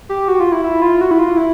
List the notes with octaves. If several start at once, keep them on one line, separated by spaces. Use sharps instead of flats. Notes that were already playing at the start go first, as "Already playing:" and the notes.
G4
F#4
F4
E4
E4
F4
F#4
E4
F4
E4